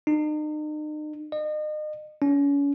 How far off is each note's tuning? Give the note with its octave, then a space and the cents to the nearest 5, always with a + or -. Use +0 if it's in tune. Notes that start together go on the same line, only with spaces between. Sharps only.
D#4 -40
D#5 -35
C#4 +35